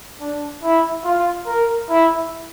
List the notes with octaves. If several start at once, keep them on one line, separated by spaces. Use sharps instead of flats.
D4
E4
F4
A#4
E4